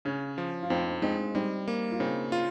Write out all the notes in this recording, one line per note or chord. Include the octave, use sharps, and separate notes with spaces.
C#3 C#4
F3
F4
F2 C4 D#4
G#3 C4 D#4
G3 C4 D#4
A#3
F4
C#3 C4 D#4
F4